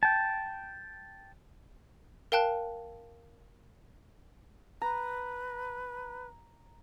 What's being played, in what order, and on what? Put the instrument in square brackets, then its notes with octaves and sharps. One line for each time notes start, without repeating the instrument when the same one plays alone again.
[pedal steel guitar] G5 A5
[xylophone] A#4 F5 G5 A5 F#6
[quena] B4 [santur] A#5